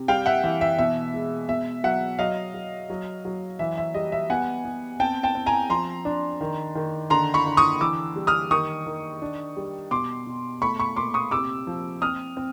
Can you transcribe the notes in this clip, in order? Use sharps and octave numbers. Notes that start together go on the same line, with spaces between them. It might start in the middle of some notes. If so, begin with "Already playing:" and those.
Already playing: C3
G3 F5 G5
E5 F#5
E3 E5
E5
B2 E5
G#3
B2 E5
F#3 E5 F#5
F#3 D#5 F5
F#3
F#3
F#3
E3 E5
E5
G3 D#5
E5
B3 F#5 G#5
B3
C4 G5 A5
G5 A5
C4
G#5 A#5
F3 A#5 C6
D4
D#3
D#3
D3 A#5 C6
B5 C#6
D3
C#6 D#6
E3 D6 E6
G3
D#6 F6
D#3 C#6 D#6
D#3
D4
G3
B2 C6 D6
B2
A3 B5 C#6
B5 C#6
A#2 C6 D6
C#6 D#6
C3 D6 E6
F3
C4 D#6 F6
C4